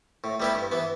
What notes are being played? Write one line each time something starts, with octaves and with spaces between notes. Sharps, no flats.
A2
G3 B3 E4 G4
G2
E3 B3